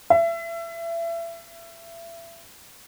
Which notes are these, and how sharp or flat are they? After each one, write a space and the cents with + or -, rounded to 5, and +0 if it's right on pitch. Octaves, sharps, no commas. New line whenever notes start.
E5 +30